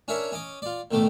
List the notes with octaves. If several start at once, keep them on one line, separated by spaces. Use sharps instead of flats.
C#4 D4 E4 A#4 C#5 E5
C#4 D#5 D6 D#6
F4 D5
A1 B2 D3 D#3 A3 D6